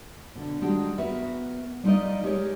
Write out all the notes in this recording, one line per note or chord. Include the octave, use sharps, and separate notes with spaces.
B2 D3
D#3 G3 G#3 D4 F#4 G4
B3 F#4 A#4 B4 E5
G3 D#4 F4 A#4 D5 D#5
G#3 G4 G#4 A#4 C#5 D#5